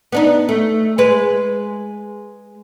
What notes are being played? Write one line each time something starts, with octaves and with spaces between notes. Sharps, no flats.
B3 D4 D#4
A3
G#3 B4